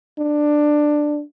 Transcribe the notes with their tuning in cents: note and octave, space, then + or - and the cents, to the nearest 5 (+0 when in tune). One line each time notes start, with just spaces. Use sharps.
D4 +10